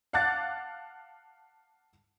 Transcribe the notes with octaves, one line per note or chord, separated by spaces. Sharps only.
F5 F#5 A5 D6 F#6 A6